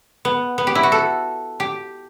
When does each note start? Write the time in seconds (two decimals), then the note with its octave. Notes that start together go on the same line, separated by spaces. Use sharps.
0.25 B3
0.58 B3
0.67 G4
0.75 E4
0.83 F#4
0.92 A4
1.60 G4